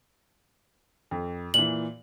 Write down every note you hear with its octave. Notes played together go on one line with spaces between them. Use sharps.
F2
A#2 E3 F#7